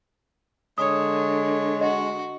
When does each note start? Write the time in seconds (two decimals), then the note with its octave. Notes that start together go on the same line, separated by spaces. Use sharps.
0.78 D3 G#3 C#5 D#6
1.81 F#4 D#5